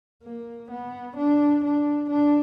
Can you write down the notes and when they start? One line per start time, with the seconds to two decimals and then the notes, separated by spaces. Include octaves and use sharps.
0.23 A#3
0.71 B3
1.16 D4
1.64 D4
2.10 D4